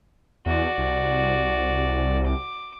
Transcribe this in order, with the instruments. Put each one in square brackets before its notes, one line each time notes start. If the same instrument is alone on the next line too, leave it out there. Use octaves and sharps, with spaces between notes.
[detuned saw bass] E2 [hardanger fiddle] F#4 D5
[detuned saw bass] C2
[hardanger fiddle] D6